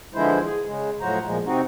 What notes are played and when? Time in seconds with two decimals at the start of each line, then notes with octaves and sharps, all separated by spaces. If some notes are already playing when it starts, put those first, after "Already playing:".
0.14 D3 E3 F3 G#3 E4 C5
0.45 G#4
0.66 C#3 G#3
1.01 A2 F3 F#3 F#4 C5 A#5
1.25 A#2 F3 G#3
1.45 C3 C4 D#4 F#4